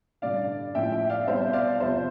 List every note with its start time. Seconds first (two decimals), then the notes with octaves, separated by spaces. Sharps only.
0.22 A1 G2 D3 D5 F5
0.75 A1 A2 F3 E5 G5
0.92 E5 G5
1.10 D5 F5
1.27 C2 B2 C5 E5
1.53 D5 F5
1.80 E2 C3 F3 C5 E5